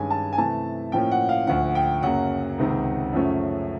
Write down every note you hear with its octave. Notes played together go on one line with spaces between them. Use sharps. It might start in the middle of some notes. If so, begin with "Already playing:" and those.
Already playing: G2 D#3 G#3 C#4 G#5
A5
G#5
C3 E3 A3 A5
A2 F3 A#3 C#4 G5
F#5
F5
D2 D3 F3 F#5
G5
F#2 C#3 F#3 A#3 F#5
C#2 C3 D#3
F#2 C#3 F3 A3 C#4